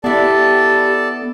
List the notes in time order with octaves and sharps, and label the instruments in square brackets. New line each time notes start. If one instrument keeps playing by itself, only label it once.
[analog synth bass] B3 [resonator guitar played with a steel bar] D4 E4 [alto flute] G4 [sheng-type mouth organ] A4 D5 A5